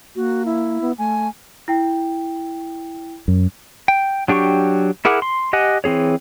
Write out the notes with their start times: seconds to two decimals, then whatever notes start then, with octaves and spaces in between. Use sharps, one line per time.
0.16 A#3 F#4
0.46 E4
0.81 B3
0.98 A3 G#5
1.68 E4 G5
3.28 F#2
3.88 G5
4.28 F#3 D4 G4 G5 C#6
5.05 E4 G#4 A#4 F#5 D6
5.22 C6
5.53 G4 D#5 F#5 G#5
5.84 E3 C4 G#4 C#5